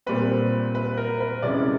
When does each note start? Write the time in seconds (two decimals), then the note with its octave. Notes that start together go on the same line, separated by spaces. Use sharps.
0.06 A#2 G3 C4 B4
0.75 B4
0.97 A#4
1.20 B4
1.43 C3 E3 G#3 C#4 D5